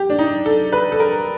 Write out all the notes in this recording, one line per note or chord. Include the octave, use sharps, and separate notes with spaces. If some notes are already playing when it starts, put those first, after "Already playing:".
Already playing: G4
D4
D#4
A4
B4
A4
A#4